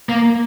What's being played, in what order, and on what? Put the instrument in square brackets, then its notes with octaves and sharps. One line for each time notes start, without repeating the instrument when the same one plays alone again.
[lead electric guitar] A#3